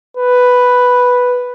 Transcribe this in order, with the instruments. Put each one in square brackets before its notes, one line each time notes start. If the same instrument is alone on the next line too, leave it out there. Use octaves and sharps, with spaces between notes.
[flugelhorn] B4